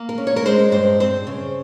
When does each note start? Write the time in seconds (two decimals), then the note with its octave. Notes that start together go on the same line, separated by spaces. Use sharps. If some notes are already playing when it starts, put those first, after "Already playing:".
Already playing: A#3
0.09 A#4
0.18 C#4
0.27 C#5
0.36 A#4
0.45 G#3 C5
0.72 G2 C5
1.00 C4 C5
1.27 C#3